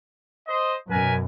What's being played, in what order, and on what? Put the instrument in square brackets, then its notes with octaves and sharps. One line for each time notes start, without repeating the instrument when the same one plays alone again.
[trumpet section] C5 D#5
[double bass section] F#2 B2 [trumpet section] A#4 B4 G#5